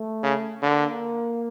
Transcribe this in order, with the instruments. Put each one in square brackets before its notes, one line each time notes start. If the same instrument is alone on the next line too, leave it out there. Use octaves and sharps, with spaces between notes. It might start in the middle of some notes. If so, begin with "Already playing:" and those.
Already playing: [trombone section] A3
[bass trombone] C#3
[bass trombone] D3 [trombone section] A#3